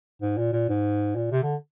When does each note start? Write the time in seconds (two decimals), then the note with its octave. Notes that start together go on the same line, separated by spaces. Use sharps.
0.22 G#2
0.38 A#2
0.53 A#2
0.69 G#2
1.16 A#2
1.32 C3
1.43 D3